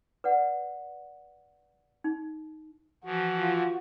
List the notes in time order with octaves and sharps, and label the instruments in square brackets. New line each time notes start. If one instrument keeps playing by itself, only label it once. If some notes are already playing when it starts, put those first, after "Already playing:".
[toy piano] B4 D5 F#5
D#4
[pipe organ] E3 F3 [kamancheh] F#4
[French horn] F4